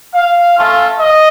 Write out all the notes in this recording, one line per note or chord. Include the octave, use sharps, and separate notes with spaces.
F5
A3 C#4 F4
D#5